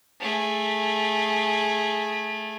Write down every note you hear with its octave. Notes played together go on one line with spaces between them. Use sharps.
A3 G#4